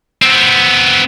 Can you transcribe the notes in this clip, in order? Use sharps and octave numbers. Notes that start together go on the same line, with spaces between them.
B3 C4